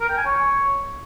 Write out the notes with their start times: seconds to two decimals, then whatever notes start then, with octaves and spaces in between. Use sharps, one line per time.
0.01 A#4
0.09 G5
0.17 G#5
0.26 C#5